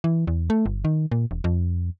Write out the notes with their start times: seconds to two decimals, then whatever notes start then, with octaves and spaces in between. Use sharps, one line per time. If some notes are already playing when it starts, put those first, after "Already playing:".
0.04 E3
0.27 E2
0.50 A3
0.66 G1
0.85 D#3
1.12 A#2
1.31 E1
1.44 F2